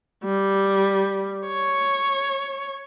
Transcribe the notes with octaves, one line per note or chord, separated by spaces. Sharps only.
G3
C#5